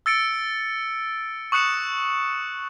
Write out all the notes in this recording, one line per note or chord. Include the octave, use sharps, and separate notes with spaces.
E6 A6 C#7 D7
C#6 D#6 F#6 C#7 E7